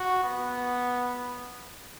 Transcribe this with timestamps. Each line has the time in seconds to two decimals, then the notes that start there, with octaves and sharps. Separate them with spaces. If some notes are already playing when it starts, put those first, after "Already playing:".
Already playing: F#4
0.24 B3